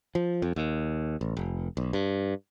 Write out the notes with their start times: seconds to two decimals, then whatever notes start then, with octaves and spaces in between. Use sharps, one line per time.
0.15 F3
0.42 F2
0.56 D#2
1.21 A1
1.37 F1
1.77 B1
1.93 G2